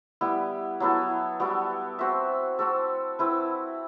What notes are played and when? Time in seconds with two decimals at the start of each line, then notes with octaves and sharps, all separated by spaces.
0.21 G3 B3 E4
0.80 F#3 B3 E4 A4
1.40 G3 B3 F#4 A4
1.99 C4 F#4 C5 E5
2.59 C4 F#4 A4
3.19 C4 E4 B4